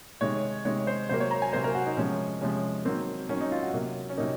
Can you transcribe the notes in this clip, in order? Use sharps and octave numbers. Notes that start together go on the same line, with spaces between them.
C3 D#3 G#3 C#5
C3 D#3 G#3 C#5
C5
C3 F#3 A#3 C5
C#5
A#5
G#5
C3 F#3 A#3 C5
A#4
F#4
D#4
C3 F3 G#3 C#4
C3 F3 G#3 C#4
D#3 F#3 A#3 C4
D#3 F#3 A#3 C#4
D#4
F4
F#4
C3 F#3 A#3
C#4
C3 F#3 A#3 D#4